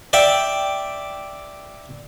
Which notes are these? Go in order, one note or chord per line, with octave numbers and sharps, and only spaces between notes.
D5 E5 G5 D6